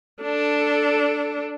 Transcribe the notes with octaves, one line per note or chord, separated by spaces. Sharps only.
D4 A4